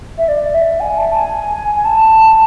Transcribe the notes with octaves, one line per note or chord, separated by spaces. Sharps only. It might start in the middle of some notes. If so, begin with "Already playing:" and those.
E5
D5
E5
G#5
A5
G#5
G#5
A5